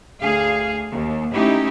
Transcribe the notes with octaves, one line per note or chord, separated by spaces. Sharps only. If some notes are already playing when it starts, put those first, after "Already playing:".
D2 G#4 F5
D#2
A3 C#4 D#4 E4 G4